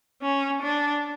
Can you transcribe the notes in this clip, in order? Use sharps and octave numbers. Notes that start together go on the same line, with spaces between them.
C#4
D4